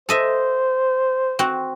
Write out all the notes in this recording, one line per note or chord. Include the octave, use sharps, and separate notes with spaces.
A4 C5 D#5 E5
C4 F#4